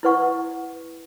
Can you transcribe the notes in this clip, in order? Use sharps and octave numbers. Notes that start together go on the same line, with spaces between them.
E4 B4 F#5 C#6